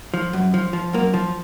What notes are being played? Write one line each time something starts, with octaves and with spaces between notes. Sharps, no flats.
F3
F#2
F3
F3
F#2 A#3
F3